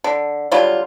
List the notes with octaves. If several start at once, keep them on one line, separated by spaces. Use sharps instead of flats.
D3
D3 F#3 G3 F4